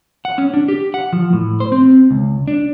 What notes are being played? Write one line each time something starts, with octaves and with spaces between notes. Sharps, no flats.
F#5
C#4
D4
G4
F#5
F3
A2
C5
C4
C#2
D4